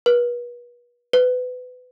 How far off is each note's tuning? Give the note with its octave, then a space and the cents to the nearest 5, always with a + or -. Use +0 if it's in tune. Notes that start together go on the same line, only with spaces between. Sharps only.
B4 -35
B4 +25